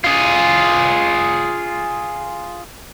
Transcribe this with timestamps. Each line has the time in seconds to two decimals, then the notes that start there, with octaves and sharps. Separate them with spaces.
0.04 F4 G#4